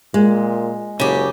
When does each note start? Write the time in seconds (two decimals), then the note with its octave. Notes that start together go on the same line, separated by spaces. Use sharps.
0.14 A#2 G#3
1.00 F#1 C#3 G4